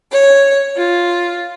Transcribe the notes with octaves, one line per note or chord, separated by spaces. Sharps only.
C#5
F4